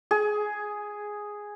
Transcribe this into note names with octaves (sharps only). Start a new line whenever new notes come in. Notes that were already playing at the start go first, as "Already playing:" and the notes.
G#4